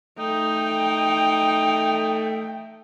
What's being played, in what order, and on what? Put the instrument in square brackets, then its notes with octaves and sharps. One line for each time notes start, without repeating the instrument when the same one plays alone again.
[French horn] A3 [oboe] D#4 [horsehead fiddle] G5